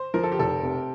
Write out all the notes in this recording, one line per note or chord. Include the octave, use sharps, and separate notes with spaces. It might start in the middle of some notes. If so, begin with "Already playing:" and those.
Already playing: C5
F3 A#4
A4
G4
F1 A4
C3